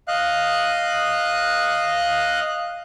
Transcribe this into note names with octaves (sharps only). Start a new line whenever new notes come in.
D#5 F5 F#6